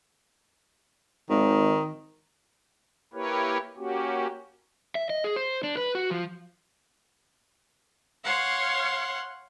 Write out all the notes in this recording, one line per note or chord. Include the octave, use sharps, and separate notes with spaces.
G#1 D#3
A#3 E4 G4 A#4 B4 C#5
A#3 C#4 F#4 G4
E5
D#5
G#4
C5
D4
B4
F#4
F3
C#5 F5 F#5 C6